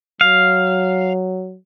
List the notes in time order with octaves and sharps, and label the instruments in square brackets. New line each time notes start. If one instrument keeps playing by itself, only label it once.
[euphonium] F#3 [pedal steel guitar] F5